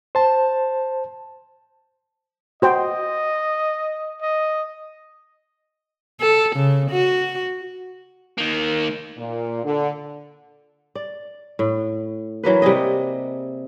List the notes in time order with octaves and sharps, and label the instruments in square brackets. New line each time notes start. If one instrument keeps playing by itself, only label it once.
[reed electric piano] C5 A5
[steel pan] F#4 C5 G5 [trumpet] D#5
[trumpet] D#5
[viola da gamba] A4
C#3
F#4
[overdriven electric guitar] D#3 A#3
[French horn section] A#2
D3
[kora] D5
A2
E3 F#3 A#3 B4
C3 G3 G#4 D#5